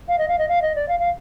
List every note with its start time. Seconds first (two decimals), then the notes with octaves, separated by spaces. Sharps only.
0.08 F5
0.18 D#5
0.28 F5
0.38 D#5
0.49 F5
0.62 D#5
0.75 D5
0.88 F5
1.00 F5